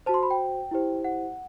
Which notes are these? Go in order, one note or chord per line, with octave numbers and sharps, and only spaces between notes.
F#4 C5 A5
C6
B5
G5
E4 G4 C5
F#5